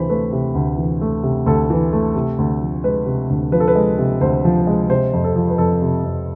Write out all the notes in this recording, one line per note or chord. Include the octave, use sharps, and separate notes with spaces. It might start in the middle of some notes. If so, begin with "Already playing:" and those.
Already playing: D2 C3 E3 C5 B5
A3 B4
C3
D2
E3
A3
C3
D2 A4
E3
A3
C3
D2
F3
G#3 B4
C3
D2
F3 B4
A4
B4
G#3
C3
D2 C5
F3
G#3
C3 C5
F2
A4
F3
B4
F2 A4
C3
F2